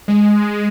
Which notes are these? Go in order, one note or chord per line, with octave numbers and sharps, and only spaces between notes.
G#3